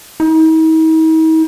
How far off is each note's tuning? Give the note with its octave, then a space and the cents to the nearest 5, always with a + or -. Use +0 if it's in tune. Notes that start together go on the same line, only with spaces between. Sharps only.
D#4 +45